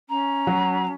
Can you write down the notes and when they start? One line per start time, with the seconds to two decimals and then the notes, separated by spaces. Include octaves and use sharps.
0.09 C#4 A#5
0.47 F#3 F#4